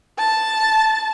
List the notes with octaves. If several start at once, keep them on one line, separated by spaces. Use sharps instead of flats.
A5